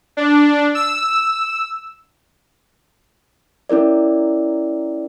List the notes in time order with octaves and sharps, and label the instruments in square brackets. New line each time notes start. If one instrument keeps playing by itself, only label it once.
[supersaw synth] D4
E6
[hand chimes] C#4 E4 A#4 D5